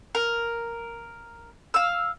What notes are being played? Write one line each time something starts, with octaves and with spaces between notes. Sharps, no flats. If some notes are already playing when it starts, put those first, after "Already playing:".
A#4
F5 E6